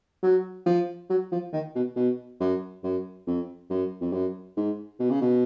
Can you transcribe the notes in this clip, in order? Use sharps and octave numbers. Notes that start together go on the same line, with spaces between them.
F#3
F3
F#3
F3
D#3
B2
B2
F#2
F#2
F2
F#2
F2
F#2
G#2
B2
C#3
B2